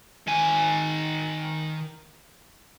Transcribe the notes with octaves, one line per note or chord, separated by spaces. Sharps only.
D#3 G#5